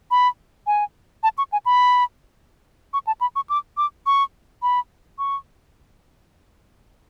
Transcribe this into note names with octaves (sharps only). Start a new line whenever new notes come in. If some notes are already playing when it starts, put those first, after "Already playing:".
B5
G#5
A5
C#6
G#5
B5
C#6
A5
B5
C#6
D6
D6
C#6
B5
C#6